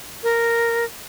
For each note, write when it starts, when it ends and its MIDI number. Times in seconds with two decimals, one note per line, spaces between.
0.23 0.85 70